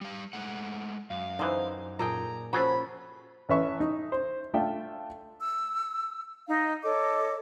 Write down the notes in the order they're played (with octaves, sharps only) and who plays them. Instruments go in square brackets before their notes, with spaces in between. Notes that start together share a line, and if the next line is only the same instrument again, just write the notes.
[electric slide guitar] G3 F5
G#3 A3 F#5
[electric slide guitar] F#2 [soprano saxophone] F5
[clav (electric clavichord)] D3 E3 [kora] D#4 C5
[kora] A#2 G#4 G5 [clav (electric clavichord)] A4 [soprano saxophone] A#5
[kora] F3 C#4 [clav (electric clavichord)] F#4 G#4 A4 [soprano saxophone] B5
[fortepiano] A1 C#4 B4 E5 C#6
D#4
C5
A3 D4 F4 E5 G5
[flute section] E6
D#4 D#5 F5
A4 C#5 D#5 D6